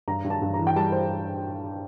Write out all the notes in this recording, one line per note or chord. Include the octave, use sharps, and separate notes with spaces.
G2 A#5
G2
A5
G2
A#5
E3
G5
G3 A5
C5